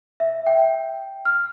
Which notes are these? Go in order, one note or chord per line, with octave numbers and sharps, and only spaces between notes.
E5
G5
F6